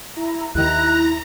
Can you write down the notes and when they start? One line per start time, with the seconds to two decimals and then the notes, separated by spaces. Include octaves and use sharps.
0.14 E4 A#5
0.55 D#2 D#3 E4 A#5 F#6